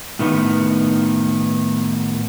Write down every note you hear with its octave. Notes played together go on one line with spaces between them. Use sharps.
A2 D#3 B3